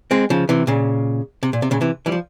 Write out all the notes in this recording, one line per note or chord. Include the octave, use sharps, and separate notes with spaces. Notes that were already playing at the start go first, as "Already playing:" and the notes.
G#3 C4
C#3 F3
C3 E3
A#2 C#3
C3
A#2
C3
A#2 C#3
C3 E3
E3 G3
F3